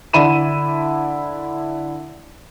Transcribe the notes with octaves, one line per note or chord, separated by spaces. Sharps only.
D3 E4 D5 B5 D#7 E7